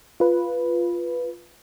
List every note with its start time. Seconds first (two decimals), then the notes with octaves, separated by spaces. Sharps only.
0.20 F4 B4